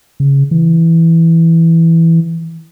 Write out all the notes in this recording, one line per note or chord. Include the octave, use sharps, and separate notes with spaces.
C#3
E3